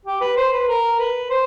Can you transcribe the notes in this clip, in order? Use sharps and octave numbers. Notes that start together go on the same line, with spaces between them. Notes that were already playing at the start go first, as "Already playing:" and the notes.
G4
B4
C5
B4
A#4
B4
C5